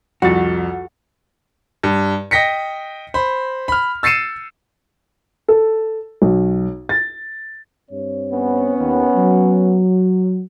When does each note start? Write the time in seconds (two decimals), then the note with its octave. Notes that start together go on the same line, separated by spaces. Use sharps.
0.22 C2 F2 F#4 A6
1.83 G2
2.31 D#5 G5 A#6 B6 C#7
3.14 C5 B5
3.68 B5 F6
4.03 E6 A6 C7 C#7 D#7 E7
5.48 A4
6.22 B1
6.89 A6
7.91 G2 C4 C#5
8.33 B3 C#4
8.77 D#2
9.15 F#3